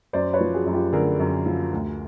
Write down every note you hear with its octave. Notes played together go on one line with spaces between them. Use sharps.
F#2 C5 D5
B4 C#5
F3
F#4 G#4
F#2
F4 G4
D3 G#4 A#4
F#2
F3
D2